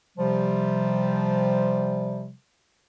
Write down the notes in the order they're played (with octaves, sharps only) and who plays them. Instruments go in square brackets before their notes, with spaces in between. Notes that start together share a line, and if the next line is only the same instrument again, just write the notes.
[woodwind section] C3 F3 G3